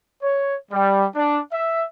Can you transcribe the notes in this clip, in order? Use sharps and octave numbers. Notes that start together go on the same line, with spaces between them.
C#5
G3
D4
E5